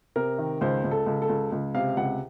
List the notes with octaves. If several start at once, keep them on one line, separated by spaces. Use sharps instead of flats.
C3 A#4
D#3
C#2 C5
C#2
A4
C#2
A4
C#2
C#2
C3 F5
C#2 F#5